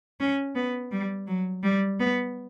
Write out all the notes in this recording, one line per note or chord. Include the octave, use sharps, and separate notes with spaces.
C#4
B3
G3
F#3
G3
B3